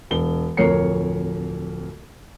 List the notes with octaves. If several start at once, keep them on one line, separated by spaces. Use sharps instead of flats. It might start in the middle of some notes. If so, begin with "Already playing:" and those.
E1 G7
D1 F2 A#4 C#5 C7 C#7